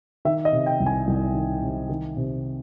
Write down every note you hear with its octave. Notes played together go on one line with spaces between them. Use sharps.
D#3 E5
D#5
C3
G5
C2
G#5
C2
D#3
C3
D#3
C3